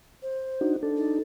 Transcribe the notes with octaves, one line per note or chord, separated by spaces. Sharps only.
C5
D4 D#4 F#4
D4 A4
D#4